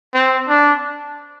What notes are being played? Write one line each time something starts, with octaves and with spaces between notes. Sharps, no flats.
C4
D4